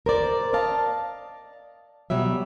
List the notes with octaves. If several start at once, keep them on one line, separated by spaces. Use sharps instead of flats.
A#4 C5 D5
D5 D#5 F5 A5
B2 F#3 G3 E5